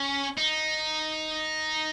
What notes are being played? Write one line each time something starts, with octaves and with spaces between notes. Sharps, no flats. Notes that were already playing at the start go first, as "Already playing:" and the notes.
Already playing: C#4
D#4